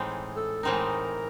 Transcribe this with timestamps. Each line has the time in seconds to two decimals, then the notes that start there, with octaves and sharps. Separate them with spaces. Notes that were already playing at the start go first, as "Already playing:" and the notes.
Already playing: A2 E3 G#3 C4 D#4
0.36 A4
0.63 A2 E3 G#3 C4 D#4 A#4